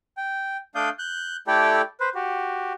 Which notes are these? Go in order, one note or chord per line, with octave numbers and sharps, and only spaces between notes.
G5
A3 D4 D5 F5 D#6 G6
F#6 G6
A3 E4 G4 A4 D5 G5
B4 C5
F#4 G4